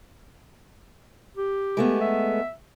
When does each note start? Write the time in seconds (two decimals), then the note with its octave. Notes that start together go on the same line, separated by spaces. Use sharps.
1.37 G4
1.77 G#3 A3 B3
2.01 E5